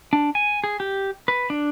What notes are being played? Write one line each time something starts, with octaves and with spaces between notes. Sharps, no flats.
D4
G#5
G#4
G4
B4
D4